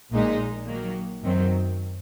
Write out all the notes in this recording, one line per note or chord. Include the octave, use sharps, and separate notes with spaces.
A#1 A#2 G#3 D#4
D#3 F#3 A#3
F#2 D#3 F#3 C4